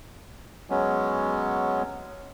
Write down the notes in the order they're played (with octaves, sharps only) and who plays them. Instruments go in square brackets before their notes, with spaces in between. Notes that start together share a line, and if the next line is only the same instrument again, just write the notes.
[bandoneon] F#3 G#3 B3 C#4